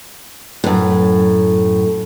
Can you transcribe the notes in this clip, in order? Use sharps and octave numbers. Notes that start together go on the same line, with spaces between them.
F#2 A2